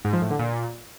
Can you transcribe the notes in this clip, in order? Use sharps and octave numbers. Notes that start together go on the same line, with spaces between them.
G#2
F3
A2
D3
A#2